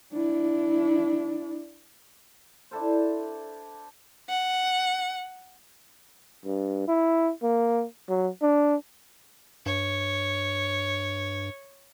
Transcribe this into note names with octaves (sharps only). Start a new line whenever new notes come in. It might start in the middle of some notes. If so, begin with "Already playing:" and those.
D4 E4
D4 E4 A4 C5
F#5
G2
E4
A#3
F#3
D4
G2 C#5